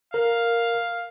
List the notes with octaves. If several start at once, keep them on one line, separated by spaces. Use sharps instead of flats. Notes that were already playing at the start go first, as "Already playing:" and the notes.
A#4 F5